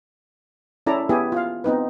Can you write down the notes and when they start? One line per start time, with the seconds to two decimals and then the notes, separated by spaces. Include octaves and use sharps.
0.87 C#4 E4 A4 D5 A#5
1.09 B3 E4 G4 G#4
1.32 F4 F5
1.64 B3 C4 D#4 B4